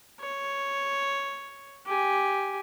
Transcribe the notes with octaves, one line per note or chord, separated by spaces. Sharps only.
C#5
G4 G#5